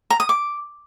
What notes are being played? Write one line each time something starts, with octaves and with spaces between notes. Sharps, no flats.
A#5
D#6
D6